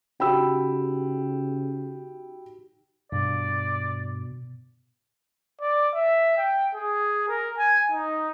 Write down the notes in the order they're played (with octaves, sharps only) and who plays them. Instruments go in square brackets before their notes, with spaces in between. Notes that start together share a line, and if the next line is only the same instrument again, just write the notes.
[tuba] C#3 [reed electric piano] D#4 F#4 G4 [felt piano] G5 B5 E6
[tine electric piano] G2 [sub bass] B2 [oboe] D5
[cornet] D5
E5
G5
G#4
A#4
G#5
D#4